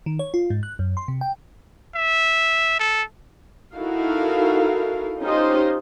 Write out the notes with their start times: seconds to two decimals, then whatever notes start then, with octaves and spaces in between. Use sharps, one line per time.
0.06 D#3
0.19 C#5
0.34 F4
0.50 G#2
0.63 F#6
0.79 F#2
0.97 C6
1.08 C3
1.21 G5
1.95 E5
2.80 A4
3.76 D#4 E4 F#4 A4 A#4 F5
5.22 C#4 D#4 F4 G4 C5 D#5